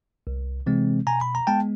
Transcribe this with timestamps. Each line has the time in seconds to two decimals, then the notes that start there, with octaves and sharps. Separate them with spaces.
0.27 C2
0.66 C3 E3 G#3 C4
1.07 B2 G#5 A#5
1.21 B5
1.35 A#5
1.47 G#3 B3 G5 A5